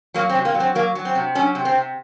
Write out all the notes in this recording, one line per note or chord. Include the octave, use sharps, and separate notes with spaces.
F#3 A#3
C4
C3
A#3
F#3
C4
F#3 A#3
F#3
C4
C3
F#3 C#4
C3
C4
C3